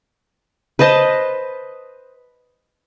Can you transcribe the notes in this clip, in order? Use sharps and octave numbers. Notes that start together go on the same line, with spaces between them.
B4 C5 D#5 A5